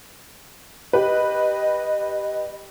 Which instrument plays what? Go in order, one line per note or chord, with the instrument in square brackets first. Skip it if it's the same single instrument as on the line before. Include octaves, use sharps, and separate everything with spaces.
[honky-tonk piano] G4 B4 [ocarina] D#5